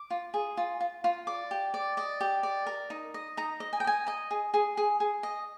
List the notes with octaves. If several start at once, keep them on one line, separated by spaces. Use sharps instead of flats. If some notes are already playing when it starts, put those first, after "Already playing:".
Already playing: D6
F4
G#4
F4
F4
F4
D5 D6
G4
D5
D5 D#5
G4
D5
A#4
D#4
D#5
D#4 A#5
D#5
G#5
G5
D#5 G#5
D#5 A#5
G#4
G#4
G#4
G#4
D#5